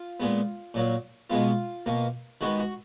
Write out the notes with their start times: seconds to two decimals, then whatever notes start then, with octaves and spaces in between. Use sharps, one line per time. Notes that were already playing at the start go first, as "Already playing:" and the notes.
Already playing: F4
0.20 A#2 G#3 B3
0.74 A#2 F#3 A#3
1.30 B2 G#3 B3 F4
1.86 B2 A#3
2.41 D#3 G#3 B3 F#4
2.59 F#4